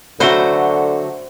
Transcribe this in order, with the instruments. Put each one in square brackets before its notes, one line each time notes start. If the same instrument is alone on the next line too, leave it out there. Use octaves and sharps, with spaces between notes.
[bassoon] D3 [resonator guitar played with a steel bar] F#3 A3 F#4 [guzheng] C5 F#5 C6